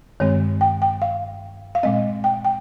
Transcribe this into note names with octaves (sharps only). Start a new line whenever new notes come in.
G2 D#3 G#3 C4 C#5
G5
G5
F5
F5
A#2 G#3 C4 D#5
G5
G5